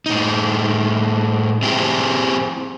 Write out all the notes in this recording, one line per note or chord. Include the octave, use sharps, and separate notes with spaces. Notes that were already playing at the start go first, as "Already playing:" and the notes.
A2 D#4
C4 E4 G4 G#4